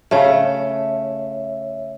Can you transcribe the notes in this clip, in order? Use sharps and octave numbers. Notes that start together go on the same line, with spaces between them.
C#3 A3 C#5 E5